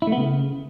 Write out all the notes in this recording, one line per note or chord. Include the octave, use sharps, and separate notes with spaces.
E4
A3
B3
C#3